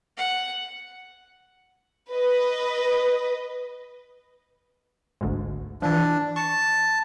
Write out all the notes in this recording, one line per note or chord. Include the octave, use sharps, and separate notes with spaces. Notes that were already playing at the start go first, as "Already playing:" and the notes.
F#5
B4 D#5
G#1 D2 G#2
E3 F3 D4
A5 C#6